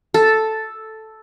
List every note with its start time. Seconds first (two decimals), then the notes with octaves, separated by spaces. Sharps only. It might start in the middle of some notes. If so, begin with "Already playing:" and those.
0.14 A4